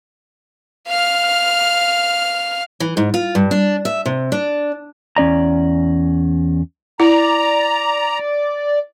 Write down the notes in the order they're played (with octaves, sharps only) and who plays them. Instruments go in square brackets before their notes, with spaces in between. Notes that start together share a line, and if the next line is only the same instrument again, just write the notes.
[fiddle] F5 F6
[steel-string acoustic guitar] E3
G#2
F4
G2
D4
E5
C3
D4
[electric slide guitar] E2 C#4 D5 A#5
[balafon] E4 [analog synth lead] D5 [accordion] A#5